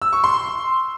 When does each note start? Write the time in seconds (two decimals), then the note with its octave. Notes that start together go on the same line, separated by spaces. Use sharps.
0.02 E6
0.13 C#6
0.24 C6